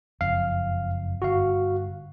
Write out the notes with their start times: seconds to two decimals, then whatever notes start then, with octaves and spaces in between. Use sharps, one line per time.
0.21 F#1 F2 F5
1.22 G1 F#4 F5